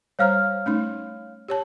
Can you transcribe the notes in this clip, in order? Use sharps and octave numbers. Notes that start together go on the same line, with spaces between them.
G3 C5 C#5 F5 A#5 F6
A3 C#4 D#4
G4 C#5 A5